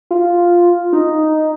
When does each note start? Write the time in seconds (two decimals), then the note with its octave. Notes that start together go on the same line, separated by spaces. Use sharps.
0.11 F4
0.93 D#4